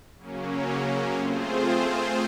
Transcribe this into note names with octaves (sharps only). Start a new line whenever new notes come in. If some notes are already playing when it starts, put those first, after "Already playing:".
C#3 F#3 A#3 C#4
A3 C4 F4 G#4 C5